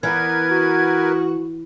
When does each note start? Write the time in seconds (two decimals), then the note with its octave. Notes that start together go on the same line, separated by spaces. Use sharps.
0.03 E3 B3 A#4 B4 G#6
0.50 F#4